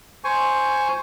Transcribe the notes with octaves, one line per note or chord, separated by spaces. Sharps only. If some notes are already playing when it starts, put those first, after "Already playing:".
C5 G#5 C#6